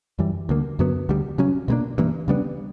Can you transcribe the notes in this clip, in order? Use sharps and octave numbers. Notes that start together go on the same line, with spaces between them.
F#2 E3 G3
D2 D3 A#3
F#2 D3 F#3 B3
D2 D3 G3
C#3 F#3 C#4
B2 G3 A#3 D4
G2 E3 A#3
C#3 G3 B3 D4